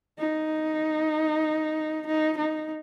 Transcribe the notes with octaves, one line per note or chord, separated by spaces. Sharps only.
D#4
D#4
D#4